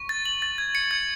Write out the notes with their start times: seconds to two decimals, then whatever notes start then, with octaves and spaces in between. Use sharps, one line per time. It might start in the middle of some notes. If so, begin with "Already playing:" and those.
Already playing: C#6
0.09 A6
0.25 F#7
0.42 A6
0.58 G#6
0.75 C#7
0.91 G#6